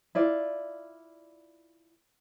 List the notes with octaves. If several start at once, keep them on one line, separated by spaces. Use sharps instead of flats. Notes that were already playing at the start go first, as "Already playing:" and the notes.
E4 F4 D5